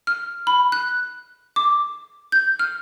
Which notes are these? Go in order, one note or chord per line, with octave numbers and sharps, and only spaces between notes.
F6
B5
F#6
D6
G6
F6